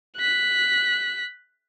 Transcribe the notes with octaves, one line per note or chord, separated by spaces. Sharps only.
F#6 B6